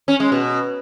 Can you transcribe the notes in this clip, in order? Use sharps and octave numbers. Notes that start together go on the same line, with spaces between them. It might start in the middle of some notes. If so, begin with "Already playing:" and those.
C#4
G#3
B2